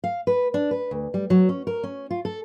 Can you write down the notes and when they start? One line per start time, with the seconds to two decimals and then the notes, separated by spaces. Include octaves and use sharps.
0.04 F5
0.27 B4
0.54 D4
0.71 B4
0.91 D2
1.14 G3
1.30 F#3
1.49 C#4
1.67 A#4
1.83 C#4
2.11 F4
2.25 A4